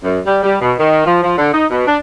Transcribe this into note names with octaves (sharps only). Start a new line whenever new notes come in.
F#2
G3
G3
B2
D#3
F3
F3
D3
D#4
B2
D4